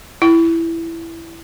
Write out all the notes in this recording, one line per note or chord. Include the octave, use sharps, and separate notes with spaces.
E4